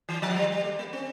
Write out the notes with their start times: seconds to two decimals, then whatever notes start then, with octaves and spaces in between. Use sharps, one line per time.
0.09 E3
0.22 F3
0.36 G3
0.52 G3
0.64 A3
0.79 A#3
0.93 C4